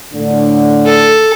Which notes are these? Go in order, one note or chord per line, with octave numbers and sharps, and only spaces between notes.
A2 D3
A4